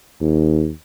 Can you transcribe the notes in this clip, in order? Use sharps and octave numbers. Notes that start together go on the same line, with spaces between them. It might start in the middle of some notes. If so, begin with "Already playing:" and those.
D#2